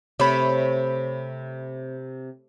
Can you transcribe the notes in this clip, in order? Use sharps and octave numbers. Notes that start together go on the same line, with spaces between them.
C3 A3 C4 C#5 B5